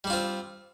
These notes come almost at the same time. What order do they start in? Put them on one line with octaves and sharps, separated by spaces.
G3 D4 F4 C4